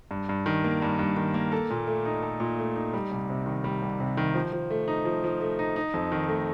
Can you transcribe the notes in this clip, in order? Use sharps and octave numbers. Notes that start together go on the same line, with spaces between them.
G2
G2
D#3
A#3
G2
G2
D#3
A#3
A4
A#2
A3
D#4
A4
A#2
A3
D#4
G3
C2
C3
D#3
G3
C2
C3
D#3
F3
F3
A3
D#4
F3
F3
A3
D#4
D#4
F2
D#3
A3